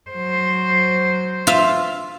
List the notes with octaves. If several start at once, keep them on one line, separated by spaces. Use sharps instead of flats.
F#3 C5
F4 E5